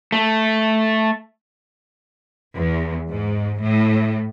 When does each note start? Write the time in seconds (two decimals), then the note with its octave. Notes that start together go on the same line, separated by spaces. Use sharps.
0.12 A3
2.56 E2
3.10 G#2
3.61 A2